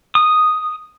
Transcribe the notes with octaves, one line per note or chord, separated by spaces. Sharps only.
D#6